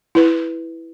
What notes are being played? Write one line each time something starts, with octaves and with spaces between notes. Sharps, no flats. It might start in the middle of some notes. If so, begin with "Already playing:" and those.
E4 B4